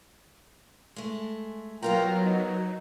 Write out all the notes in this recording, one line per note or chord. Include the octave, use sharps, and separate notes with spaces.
G#3 A3
F#3 B3 F4 A#4 F5 G5 A#5
D#4